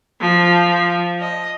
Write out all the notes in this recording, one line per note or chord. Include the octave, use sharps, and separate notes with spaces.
F3
D#5